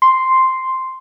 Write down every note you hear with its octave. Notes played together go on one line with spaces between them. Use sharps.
C6